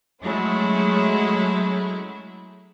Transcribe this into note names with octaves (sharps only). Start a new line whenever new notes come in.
F#3 G#3 A3 C#4 E4